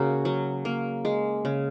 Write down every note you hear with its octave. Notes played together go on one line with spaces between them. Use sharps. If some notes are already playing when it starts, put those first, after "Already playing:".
Already playing: C#3 A#3 F#4 A#4
F#3
A#3
G#3
C#3